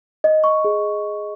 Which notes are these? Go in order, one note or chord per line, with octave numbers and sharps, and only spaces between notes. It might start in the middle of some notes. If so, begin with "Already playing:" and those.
D#5
C#6
G#4